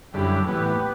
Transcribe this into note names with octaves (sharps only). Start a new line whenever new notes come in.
F#2 D3 G3 E4 G4
A2 E3 B3 G4 B4
B3